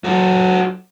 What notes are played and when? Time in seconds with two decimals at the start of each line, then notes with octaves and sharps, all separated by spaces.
0.04 F#3 F#4 A4